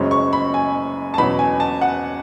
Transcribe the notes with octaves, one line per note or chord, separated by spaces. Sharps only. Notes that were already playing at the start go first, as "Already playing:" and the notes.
Already playing: F#1 F#2 C#3 G#3 C#4
C#6
B5
G#5
A5
E2 B2 F#3 C#4 B5
G#5
A5
F#5